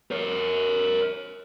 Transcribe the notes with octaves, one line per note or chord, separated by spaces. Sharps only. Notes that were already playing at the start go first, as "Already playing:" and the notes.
A#4 C#5